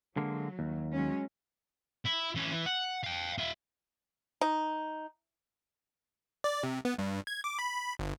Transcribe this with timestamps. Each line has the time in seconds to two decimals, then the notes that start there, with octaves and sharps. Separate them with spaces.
0.17 D3 F#3 G#3 A#3
0.59 D#2
0.92 F#3 G#3 C#4
2.05 E4
2.35 E3 C#4
2.52 E3
2.66 F#5
3.04 F5 G5
3.38 F4 E5
4.41 D#4
6.44 D5
6.63 C3
6.85 B3
6.99 G2
7.27 G#6
7.44 D6
7.59 B5
7.99 G1